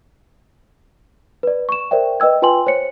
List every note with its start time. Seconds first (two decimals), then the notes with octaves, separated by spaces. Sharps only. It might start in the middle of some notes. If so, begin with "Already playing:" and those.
1.43 B4 D5
1.69 C#6 E7
1.91 A#4 C5 D5 E5 G5
2.20 B4 D#5 G5 E6 G#6
2.42 F4 B4 G5 G#5 C6 F#7
2.67 C5 C#5 C#7